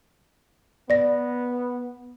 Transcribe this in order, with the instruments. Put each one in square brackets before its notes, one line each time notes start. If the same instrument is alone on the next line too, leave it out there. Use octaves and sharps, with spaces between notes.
[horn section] B3 [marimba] D5 A#6